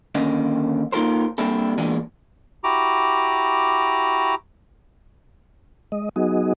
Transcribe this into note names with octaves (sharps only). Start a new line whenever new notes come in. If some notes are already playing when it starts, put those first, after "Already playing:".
D#2 D3 A#3 C#4 D#5
A#3 D#4 F4 A4 A#4 C5
G3 A#3 C4 D4 E4 A4
E2 A#2 E3 G#3 A#3 D4
E4 F#4 G4 A#5 D6
G#3 D#5
F#3 B3 D#4 F#4 G#4 D#5